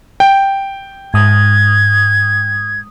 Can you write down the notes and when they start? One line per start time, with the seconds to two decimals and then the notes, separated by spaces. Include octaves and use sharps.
0.20 G5
1.14 G#2 D#6 G#6